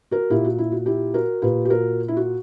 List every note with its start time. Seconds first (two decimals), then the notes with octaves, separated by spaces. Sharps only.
0.11 F#4 A#4
0.30 A#2 E4 G4
0.44 F#4
0.58 E4
0.72 F#4
0.86 E4 G4
1.14 F#4 A#4
1.42 A#2 G4 B4
1.65 G4
1.70 F#4 A#4
2.08 E4
2.17 F#4